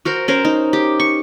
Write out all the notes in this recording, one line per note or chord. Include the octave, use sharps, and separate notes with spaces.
F#4 A#4 C5
C#4 A#4 C5
D#4
G4
C#6